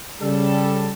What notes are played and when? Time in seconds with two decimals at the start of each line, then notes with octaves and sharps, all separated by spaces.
0.21 C#3 G3 A4